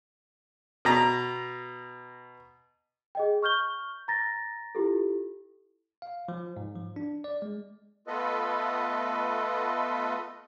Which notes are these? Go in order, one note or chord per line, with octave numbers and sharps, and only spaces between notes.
B2 A#5
G#4 D#5 G5
C#6 F6 G6 G7
A#5 A6 A#6
E4 F4 G4 A4
F5
F3
G#2
F3
D4
D5
G#3
A3 B3 F4 A4 B4 D#5